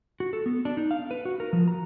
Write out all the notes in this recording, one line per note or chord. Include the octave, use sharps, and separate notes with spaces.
F#4
A4
B3
D4
D#4
F5
B4
F#4
A#4
F3
A#5